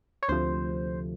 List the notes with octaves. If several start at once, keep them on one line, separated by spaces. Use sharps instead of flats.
C#5
D2 C3 F3 A3 C5